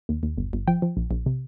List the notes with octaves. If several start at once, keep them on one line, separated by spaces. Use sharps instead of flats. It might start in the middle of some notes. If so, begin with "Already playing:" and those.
D#2
D#2
G1
G1
F3 G5
F3
A#1
A#1
C3